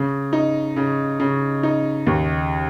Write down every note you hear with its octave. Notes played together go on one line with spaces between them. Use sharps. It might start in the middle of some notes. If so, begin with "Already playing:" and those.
Already playing: C#3
D#4
C#3
C#3
D#4
D#2